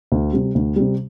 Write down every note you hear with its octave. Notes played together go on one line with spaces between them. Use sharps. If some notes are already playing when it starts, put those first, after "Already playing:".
D2
C3 G3
D2
C3 G3